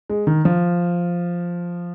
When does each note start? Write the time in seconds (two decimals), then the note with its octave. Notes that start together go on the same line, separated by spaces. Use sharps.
0.10 G#3
0.27 D#3
0.45 F3